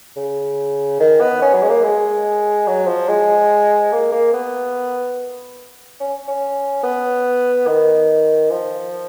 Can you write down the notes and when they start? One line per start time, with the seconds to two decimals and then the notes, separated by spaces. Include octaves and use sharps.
0.16 C#3
1.00 D#3
1.20 B3
1.42 C#4
1.54 F#3
1.62 G#3
1.69 A#3
1.83 G#3
2.67 F#3
2.87 F3
3.08 G#3
3.92 A#3
4.12 A#3
4.33 B3
6.00 C#4
6.28 C#4
6.83 B3
7.67 D#3
8.51 F3